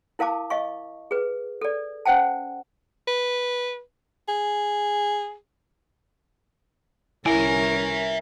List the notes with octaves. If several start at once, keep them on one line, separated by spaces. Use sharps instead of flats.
E4 A#4 F5 A5 D6
D#5 F5 C#6
G#4 B4
A4 D5
C#4 C5 F#5 G5 A5
B4
G#4
C2 C#4 E4 A#4 E5 G#5